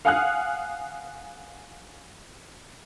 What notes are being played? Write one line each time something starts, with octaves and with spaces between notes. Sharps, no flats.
F5 F#5 G#5 D#6 F6 F#6